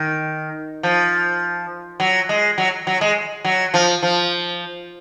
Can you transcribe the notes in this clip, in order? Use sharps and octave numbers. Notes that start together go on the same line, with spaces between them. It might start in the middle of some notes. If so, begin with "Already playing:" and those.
Already playing: D#3
F3
F#3
G#3
F#3
F#3
G#3
F#3
F3
F3